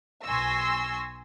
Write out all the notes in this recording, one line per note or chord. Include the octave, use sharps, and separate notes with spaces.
B1 G#5 C6 C#6 E6 A#6